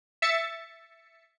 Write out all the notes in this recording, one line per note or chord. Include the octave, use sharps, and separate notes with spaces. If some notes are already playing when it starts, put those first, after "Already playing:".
E5 A6 C#7